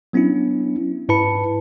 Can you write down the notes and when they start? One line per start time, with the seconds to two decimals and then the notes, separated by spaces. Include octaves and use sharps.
0.13 F#3 B3 C#4 D4 E4
1.09 G#2 E4 B4 A5 B5 C#7